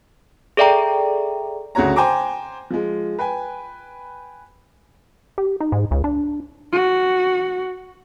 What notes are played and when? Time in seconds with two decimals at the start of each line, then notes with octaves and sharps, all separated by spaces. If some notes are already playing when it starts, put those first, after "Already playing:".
0.57 G#4 A4 D5 E5 G5 A#5
1.75 D2 C#3 F#4 C#5 A#5
1.96 C5 G5 G#5 A#5 D6
2.70 F3 G#3
3.19 B4 G5 G#5
5.38 G4
5.60 D#4
5.72 G#2
5.91 C#2
6.04 D4
6.73 F#4